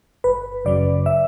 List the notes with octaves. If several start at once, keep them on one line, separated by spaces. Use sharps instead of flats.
G1 B4
F#2 C#3 F#3 D5
E5